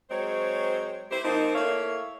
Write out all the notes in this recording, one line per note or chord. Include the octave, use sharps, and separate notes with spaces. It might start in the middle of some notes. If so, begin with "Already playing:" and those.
F#3 G#3 C4 C5 C#5
E4 G4 C5
F3 A#3 C4 D#4
A3 A#3 E4 C#5 F5